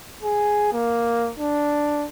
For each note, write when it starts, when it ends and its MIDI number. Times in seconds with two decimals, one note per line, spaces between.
0.23 0.73 68
0.73 1.31 58
1.39 2.06 62